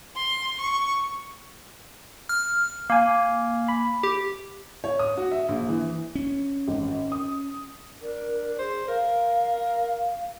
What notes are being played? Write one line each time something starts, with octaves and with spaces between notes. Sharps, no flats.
C6
C#6
F6
A#3 F5 G#5
B5
G4
C#5
D#6
F#4
E5
A#1
E3
C#4
G#1
D#6
D4 A#4
G#4 C5
A#4 F5